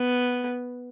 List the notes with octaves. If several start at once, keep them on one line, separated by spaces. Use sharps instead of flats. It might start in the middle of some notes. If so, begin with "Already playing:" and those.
Already playing: B3